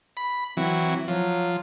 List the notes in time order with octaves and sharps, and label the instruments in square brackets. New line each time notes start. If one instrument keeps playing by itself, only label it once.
[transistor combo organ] B5
[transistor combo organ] E3 F#3 [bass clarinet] C4
[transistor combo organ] F3 [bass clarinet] F#3